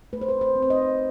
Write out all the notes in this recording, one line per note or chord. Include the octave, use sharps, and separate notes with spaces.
A3 B4
C5
B4
C5
C4
C5
D#5